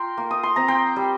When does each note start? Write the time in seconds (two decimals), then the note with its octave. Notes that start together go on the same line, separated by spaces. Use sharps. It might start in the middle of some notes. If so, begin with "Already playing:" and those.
Already playing: F4 G5 A#5 C6
0.17 A#3
0.31 D#6
0.43 C6
0.56 C4 A#5
0.68 G5 C6
0.96 G3